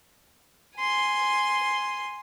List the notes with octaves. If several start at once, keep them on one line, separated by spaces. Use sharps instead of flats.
G#5 C6